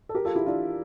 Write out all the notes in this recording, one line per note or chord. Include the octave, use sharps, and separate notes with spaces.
A4
G4 A#4
F4 A4
E4 G4
D4 F4